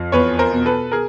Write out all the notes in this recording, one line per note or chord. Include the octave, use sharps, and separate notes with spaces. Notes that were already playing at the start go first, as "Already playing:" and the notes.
Already playing: F2
E2 B4 C#5
A#4 C5
B2
A4 B4
G#4 A#4